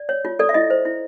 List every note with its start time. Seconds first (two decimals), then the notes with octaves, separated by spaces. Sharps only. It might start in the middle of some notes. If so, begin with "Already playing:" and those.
Already playing: D5
0.09 C#5
0.25 F4
0.39 A4 D5
0.49 E5
0.54 E4 D#5
0.70 C5
0.85 E4